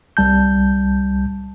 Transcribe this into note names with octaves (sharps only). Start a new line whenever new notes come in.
C2 G3 A5 G6